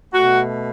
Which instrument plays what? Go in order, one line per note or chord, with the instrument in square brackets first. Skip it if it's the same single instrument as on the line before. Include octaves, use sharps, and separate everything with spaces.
[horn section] B2 A3 F#4